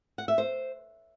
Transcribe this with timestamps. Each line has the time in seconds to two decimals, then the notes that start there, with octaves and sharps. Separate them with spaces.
0.18 F#5
0.28 E5
0.38 C5